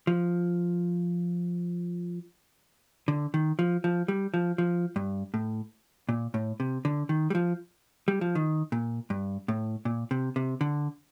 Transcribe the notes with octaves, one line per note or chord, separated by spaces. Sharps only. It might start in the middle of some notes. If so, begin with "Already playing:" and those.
F3
D3
D#3
F3
F3
G3
F3
F3
G2
A2
A#2
A2
C3
D3
D#3
G3
F3
G3
F3
D#3
A#2
G2
A2
A#2
C3
C3
D3